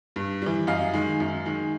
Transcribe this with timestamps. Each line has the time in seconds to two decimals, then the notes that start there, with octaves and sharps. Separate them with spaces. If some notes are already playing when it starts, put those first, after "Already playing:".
0.16 G2
0.42 E3 G3
0.67 F#2 D#5 F5
0.93 D#3 G#3
1.20 F#2
1.46 D#3 G#3